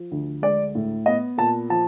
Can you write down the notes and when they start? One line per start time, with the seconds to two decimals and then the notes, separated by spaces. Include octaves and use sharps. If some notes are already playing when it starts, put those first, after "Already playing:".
Already playing: F3
0.11 D2
0.42 G#3 D5
0.75 A2
1.06 B3 D#5
1.38 A#2 A5
1.70 F3 A5